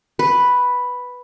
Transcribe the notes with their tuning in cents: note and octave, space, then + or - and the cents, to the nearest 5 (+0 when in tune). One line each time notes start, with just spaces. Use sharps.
B4 +0